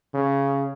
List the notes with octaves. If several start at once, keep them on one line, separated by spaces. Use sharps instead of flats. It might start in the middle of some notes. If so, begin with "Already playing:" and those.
C#3